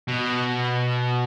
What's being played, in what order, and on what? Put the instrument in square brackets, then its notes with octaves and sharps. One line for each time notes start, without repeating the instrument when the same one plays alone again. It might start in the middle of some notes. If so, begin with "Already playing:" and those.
[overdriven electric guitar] B2